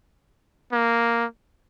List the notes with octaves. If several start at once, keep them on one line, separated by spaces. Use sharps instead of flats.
A#3